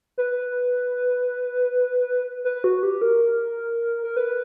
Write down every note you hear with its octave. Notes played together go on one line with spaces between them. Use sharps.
B4
B4
F#4
G4
A#4
A#4
B4